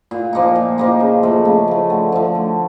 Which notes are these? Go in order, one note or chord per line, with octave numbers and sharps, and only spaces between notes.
A#2
F3 A#3 D#4
A#2
F3 A#3 D#4
C#3
F3 A3
C#3
F3 A3
D3
F3 A3
D3